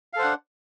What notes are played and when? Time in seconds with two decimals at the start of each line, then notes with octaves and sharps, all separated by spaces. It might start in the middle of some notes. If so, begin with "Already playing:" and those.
0.13 F5
0.16 A4
0.19 C5
0.22 F#5
0.24 D4